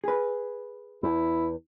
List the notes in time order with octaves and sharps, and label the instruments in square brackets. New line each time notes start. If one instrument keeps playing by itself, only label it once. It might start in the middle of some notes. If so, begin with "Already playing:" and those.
[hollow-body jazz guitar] G#4 B4
[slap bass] E2 [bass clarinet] E4